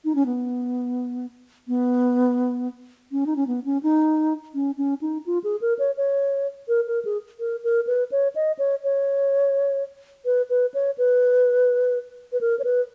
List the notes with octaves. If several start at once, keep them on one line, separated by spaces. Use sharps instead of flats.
D#4
C#4
B3
B3
C#4
D#4
C#4
B3
C#4
D#4
C#4
C#4
D#4
F4
G#4
A#4
C#5
C#5
A#4
A#4
G#4
A#4
A#4
B4
C#5
D#5
C#5
C#5
B4
B4
C#5
B4
B4
A#4
C#5
B4